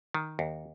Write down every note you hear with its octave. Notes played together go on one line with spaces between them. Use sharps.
D#3
D#2